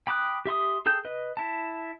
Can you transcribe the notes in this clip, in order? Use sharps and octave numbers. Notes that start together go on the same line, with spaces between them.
G5 B5 D6 D#6 F#6
G4 E5 C6 D#6
G#4 A4 G5 G6
B4 D#5
E4 A5